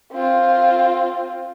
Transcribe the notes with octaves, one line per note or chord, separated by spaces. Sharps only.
C4 F4